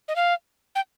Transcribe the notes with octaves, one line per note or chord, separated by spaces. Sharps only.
D#5
F5
G5